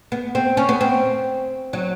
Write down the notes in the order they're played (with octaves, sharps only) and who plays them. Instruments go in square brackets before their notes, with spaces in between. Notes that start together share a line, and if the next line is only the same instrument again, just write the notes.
[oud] B3
C4
C#4
B3
C4
F#3